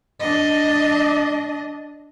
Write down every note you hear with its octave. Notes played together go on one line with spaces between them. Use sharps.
D4 D#5